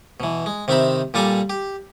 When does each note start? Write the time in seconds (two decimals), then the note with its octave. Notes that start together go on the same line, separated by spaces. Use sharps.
0.20 B2 E3
0.46 G#3
0.68 C3 D#3 C4 E5 A#5 B5
1.14 A#2 G3 A4 D5 G#5 A#5
1.50 G4